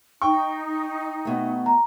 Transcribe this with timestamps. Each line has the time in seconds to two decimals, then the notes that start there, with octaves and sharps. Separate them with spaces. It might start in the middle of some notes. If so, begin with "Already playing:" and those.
0.22 D#4 G5 C#6
1.25 B2 A3
1.66 A#5